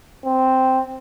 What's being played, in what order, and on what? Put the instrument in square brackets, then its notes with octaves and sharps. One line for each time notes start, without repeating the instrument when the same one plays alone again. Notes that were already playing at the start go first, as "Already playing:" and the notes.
[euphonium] C4